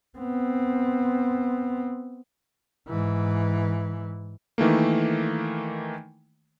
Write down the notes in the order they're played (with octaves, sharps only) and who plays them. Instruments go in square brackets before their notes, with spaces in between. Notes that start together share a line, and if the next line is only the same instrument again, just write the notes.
[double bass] B3 C4
G#2 E3
[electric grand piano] D#3 E3 A3 A#3